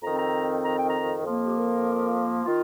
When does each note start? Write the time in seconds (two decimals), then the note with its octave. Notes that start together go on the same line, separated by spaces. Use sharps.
0.03 F2 D#3 C4 A#5
0.18 A#5
0.64 A#5
0.78 G5
0.90 A#5
1.24 F2 F3 A#3
1.45 G4
1.55 A#4
2.45 D#3 F4